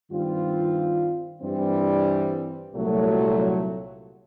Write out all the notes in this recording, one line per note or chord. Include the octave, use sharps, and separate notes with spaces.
G2 D#3 G3 C4 F4
G2 E3 G3 C4
C2 A#2 F#3 A3